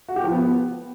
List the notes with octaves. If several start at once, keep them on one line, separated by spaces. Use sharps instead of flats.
F#4
G4
F3
B3